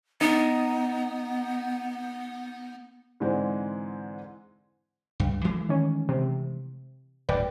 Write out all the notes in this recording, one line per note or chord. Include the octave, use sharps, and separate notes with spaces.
B3 D#4
G#2 D3 E3 G#3 C4
C#2 G2
E3 G#3 A3
D#3 C#4
C3
D1 G2 B4 D5 G5